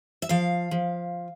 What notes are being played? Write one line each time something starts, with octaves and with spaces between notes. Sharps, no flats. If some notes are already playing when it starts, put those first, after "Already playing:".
E5
F3 F5
F3